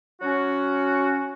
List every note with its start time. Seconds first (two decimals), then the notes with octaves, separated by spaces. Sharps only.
0.21 F#3 C#4 F#4